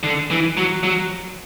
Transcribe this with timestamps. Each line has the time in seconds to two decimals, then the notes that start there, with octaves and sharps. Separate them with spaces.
0.03 D3
0.30 E3
0.57 F#3
0.84 F#3